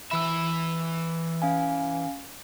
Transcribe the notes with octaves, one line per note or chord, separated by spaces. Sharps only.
E3 E5 B5 E6
C#4 F5 G#5